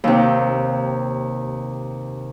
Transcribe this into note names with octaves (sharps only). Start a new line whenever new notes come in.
D#2 C3